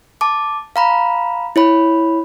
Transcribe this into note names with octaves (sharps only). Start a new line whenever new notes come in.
A5 D6
F5 A#5 B5
E4 C#5 B5